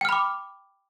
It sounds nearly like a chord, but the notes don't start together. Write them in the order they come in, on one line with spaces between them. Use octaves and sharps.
G5 F6 B5 D6